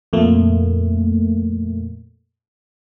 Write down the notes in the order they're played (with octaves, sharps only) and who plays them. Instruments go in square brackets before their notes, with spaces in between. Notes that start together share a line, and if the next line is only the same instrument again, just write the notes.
[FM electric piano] F2 A#2 A3 A#3